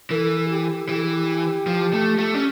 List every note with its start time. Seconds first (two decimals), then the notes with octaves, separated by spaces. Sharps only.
0.11 E3 A#4
0.15 A4
0.50 G4
0.89 E3 G4
0.96 A4
1.05 G4
1.67 F3
1.93 A3
2.18 A3
2.35 C#4